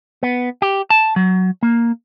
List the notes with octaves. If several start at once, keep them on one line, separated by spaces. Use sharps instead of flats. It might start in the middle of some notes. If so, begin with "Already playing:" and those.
B3
G4
A5
F#3
A#3